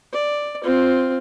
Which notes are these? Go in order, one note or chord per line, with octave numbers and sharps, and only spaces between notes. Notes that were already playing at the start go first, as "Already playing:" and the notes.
D5
C4 F4